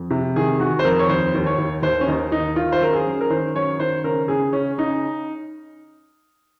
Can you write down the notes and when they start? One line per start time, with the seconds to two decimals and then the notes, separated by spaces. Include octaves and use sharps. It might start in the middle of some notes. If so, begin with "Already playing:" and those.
Already playing: F2
0.10 C3
0.36 D#3 G#4
0.60 D#3 F#4
0.79 C5
0.84 F2 A#4
0.99 C#5
1.09 D#2 C5
1.34 D#2
1.46 C#5
1.58 D#2
1.82 D#2 C5
2.01 C#4
2.07 D#2 D#4
2.32 D#2 D#4
2.56 D#3 F4
2.72 C5
2.81 F#2 A#4
2.93 G#4
3.06 F#2
3.21 A#4
3.30 D#3 C5
3.55 F#2 C#5
3.79 D#3 C5
4.04 C#3 A#4
4.28 C#3 G#4
4.53 C#3 C#4
4.78 C#3 D#4